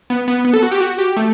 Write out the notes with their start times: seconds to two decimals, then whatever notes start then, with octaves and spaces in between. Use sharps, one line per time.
0.10 B3
0.28 B3
0.45 B3
0.54 A4
0.63 F#4
0.72 G4
0.80 F#4
0.98 G4
1.17 A3